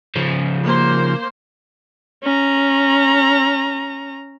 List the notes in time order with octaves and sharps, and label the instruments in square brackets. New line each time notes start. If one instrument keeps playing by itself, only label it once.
[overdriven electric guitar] C#3 F3
[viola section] A#3 C5
[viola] C#4 A#5